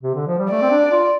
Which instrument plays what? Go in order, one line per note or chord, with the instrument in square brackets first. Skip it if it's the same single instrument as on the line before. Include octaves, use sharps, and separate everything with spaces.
[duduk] C3
D3
F3
G3
[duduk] A3 [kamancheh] D5
[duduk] C4
D4
F4